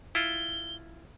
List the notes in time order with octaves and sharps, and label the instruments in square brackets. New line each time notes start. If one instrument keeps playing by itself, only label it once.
[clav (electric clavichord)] E4 F4 [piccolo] G7